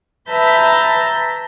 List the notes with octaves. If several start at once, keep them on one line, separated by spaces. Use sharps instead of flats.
B4 E5 A5 A#5 G6